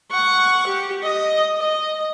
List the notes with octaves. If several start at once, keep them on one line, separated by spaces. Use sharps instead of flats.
F#5 C#6
G4
D#5
D#5